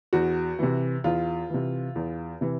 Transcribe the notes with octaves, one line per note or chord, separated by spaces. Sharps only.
E2 F#4
C3 E3
E2 F4
C3 E3
E2
C3 E3